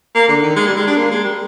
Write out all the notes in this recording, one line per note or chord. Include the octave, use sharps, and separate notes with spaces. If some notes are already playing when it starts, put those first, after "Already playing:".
A#3
D3
D#3
G#3
G3
G#3
D4
A#3
G#3
G3